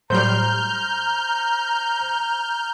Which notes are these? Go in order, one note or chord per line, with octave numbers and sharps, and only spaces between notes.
A2 F#3 G3 C5 A#5 F6 G6